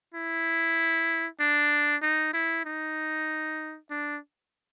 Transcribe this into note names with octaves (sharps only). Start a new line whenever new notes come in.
E4
D4
D#4
E4
D#4
D4